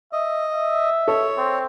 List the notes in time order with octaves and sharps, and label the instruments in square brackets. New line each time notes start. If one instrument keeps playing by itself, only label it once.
[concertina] D#5 [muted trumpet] E5
[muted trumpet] E5
[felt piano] A4 [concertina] C#5
[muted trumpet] C4